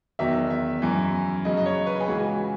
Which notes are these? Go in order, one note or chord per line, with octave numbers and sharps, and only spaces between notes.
E2 D#3 F#3 E5
E5
F#2 E3
F#2 C#3 F#3 D#5
D#5
C#5
B4
G#4
C#2 C#3 E3 F#4